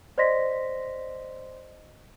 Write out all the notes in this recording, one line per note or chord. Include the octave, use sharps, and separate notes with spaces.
C5 D5 D#5 C6 A#6 B6